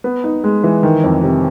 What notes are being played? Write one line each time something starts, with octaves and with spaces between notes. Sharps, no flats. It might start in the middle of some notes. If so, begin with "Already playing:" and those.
B3
D#4
G#3
E3
D#3
F2
C3